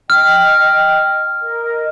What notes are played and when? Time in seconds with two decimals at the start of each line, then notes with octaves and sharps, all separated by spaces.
0.10 D#5 G5 F6
1.41 A#4 D#5